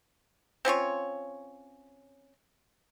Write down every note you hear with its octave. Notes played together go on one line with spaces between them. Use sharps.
C4 C#4 F4 C#5